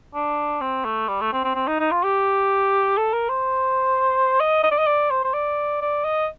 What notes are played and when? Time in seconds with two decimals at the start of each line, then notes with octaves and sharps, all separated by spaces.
0.14 D4
0.61 C4
0.85 A3
1.08 G3
1.21 A3
1.33 C4
1.44 C4
1.55 C4
1.68 D#4
1.80 D#4
1.91 F4
2.04 G4
2.97 A4
3.13 A#4
3.29 C5
4.40 D#5
4.63 D#5
4.71 D5
4.78 D#5
4.87 D5
5.10 C5
5.24 C5
5.34 D5
5.82 D5
6.05 D#5